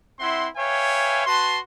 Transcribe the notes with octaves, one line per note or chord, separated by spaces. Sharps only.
C4 E4 E5 F#5 C6
B4 C#5 E5 F5 G5 G#5
F#4 B4 A5 C6